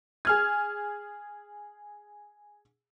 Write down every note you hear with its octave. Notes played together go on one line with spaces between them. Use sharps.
G#4 F6 G#6